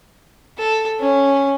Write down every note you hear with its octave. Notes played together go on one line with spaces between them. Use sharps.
A4
C#4